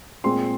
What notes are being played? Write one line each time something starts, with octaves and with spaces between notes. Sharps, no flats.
A#2 G#3 C4 C6